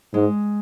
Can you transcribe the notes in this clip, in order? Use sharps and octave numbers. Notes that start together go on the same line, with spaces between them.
G#2 G#3